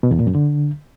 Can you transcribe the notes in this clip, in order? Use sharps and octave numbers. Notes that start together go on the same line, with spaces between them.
B2
E2
A#2
F#2
D3